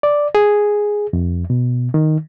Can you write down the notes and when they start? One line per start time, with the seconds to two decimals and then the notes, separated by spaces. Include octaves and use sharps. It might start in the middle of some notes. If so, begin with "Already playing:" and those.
0.03 D5
0.35 G#4
1.13 F2
1.50 B2
1.94 D#3